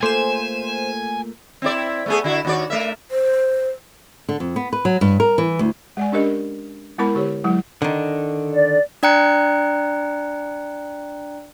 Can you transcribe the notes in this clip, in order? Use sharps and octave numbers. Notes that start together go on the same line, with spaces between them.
A3 A#3 F4 A4 C5 G#5 E7
C4 E4 D5
A3 B3 G#4
D3 E4 F#4
D#2 F#4 D5
A3 A#4 E5
C5
D3
F2
B3
B4
F#3
G2
A#4
E3
D2
G#3 D5 G#5
C#4 D4 G4 A#4 D#5
G#3 B3 E4 A#4 B5
D3 G4 C#5
F#3 G#3 E4
D3 D#3
D5
D4 D5 G5 A#5 F#6 C#7